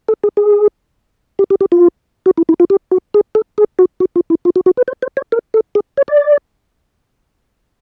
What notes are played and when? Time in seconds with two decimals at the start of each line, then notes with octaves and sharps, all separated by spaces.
0.08 A4
0.24 G#4
0.37 G#4
1.39 G4
1.50 G4
1.61 G4
1.72 F4
2.26 F#4
2.38 E4
2.49 E4
2.60 F4
2.70 G4
2.91 F#4
3.14 G#4
3.35 A4
3.58 G#4
3.79 F#4
4.00 F#4
4.16 F4
4.30 E4
4.45 F4
4.56 F#4
4.66 F#4
4.77 B4
4.88 C5
5.02 C5
5.17 C#5
5.32 A#4
5.54 A4
5.75 G#4
5.97 C#5
6.08 D5